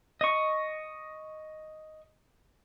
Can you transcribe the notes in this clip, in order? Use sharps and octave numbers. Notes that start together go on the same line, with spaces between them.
D#5 C#6